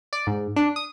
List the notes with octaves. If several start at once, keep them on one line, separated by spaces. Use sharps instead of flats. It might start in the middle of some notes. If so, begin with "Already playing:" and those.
D5
G#2
D4
D#6